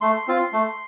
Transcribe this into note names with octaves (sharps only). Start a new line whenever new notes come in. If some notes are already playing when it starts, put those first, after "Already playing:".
A3 C6
C4 F4
A3